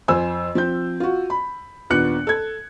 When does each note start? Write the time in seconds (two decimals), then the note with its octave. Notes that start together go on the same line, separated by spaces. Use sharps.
0.08 F2 C5 G#5 E6
0.55 F3 C4 G6
1.00 F4 F#4
1.30 B5
1.90 D#2 A#2 B3 D4 F#6 C#7
2.27 A4 G#6